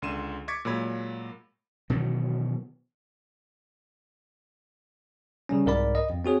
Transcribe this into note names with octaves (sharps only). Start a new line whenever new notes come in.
C#2 D3 C6 D#7 E7
C#6 D6 G#6 A6 B6 C#7
A#2 F#3 G#3 C#5 B5 G#6
B2 D#3 E3 F#3
C#3 G3 C#4
C2 G#2 A#4 D5 B5
D#5
F2
C4 F#4 G#4 C#5